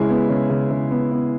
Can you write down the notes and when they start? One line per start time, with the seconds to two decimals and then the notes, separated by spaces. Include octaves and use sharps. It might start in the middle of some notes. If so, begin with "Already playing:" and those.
Already playing: C#3 G#3 E4
0.09 B3
0.29 C#3
0.50 C#3
0.71 C#3
0.91 B3
1.12 B3